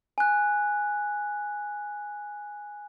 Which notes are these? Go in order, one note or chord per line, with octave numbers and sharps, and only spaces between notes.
G#5 F#6